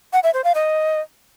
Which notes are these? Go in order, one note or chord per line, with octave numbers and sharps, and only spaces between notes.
F#5
E5
C5
F5
D#5